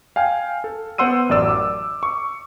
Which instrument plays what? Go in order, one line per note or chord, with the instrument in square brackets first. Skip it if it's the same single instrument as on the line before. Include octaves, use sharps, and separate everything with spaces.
[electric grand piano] F5 G5 G#5 F6
A4
B3 C5 F#5 C6 E6 D#7
A1 F#2 D5 E6
D6
C#6